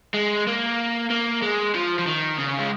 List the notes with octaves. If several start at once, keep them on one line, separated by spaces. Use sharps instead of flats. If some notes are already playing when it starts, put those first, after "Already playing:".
G#3
A#3
A#3
G#3
F3
F3
D#3
C#3
G#3